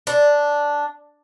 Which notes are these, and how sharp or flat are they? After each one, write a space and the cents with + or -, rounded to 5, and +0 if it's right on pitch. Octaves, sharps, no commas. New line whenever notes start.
D4 -5